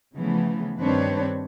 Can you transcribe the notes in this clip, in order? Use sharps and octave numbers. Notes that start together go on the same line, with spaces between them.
C#3 E3 F3 A3 B3
G2 D#3 C4 D4 B4 C#5